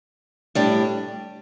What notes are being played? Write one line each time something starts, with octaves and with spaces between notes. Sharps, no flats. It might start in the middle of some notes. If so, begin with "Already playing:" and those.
A2 G3 D4